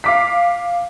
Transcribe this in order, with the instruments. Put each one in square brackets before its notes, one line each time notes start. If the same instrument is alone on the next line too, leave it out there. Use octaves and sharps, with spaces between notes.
[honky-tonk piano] F5 D6 B6